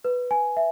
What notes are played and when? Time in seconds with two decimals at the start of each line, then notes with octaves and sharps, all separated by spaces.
0.05 B4
0.31 G#5
0.57 E5